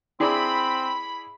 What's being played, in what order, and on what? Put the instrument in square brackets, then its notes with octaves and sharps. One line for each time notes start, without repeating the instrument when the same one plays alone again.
[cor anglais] C4 [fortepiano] E4 G#4 D5 [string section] B5